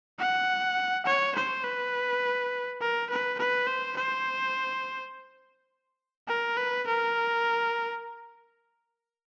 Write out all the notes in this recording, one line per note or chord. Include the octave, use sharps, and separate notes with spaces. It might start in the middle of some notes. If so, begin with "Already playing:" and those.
F#5
C#5
C5
B4
A#4
B4
B4
C5
C5
A#4
B4
A#4